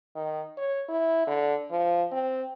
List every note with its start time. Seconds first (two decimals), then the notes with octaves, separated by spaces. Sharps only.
0.15 D#3
0.58 C#5
0.89 E4
1.27 D3
1.71 F3
2.12 C4